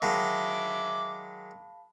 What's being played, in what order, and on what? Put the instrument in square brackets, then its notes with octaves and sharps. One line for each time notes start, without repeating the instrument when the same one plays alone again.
[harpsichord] D#3 F#3 G#3 [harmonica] E5 D6 [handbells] F5 A5 B5